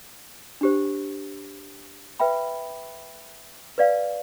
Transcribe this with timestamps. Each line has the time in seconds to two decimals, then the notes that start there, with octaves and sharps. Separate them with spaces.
0.61 D4 G4 C5
2.19 B4 E5 G5 B5
3.78 B4 D5 F5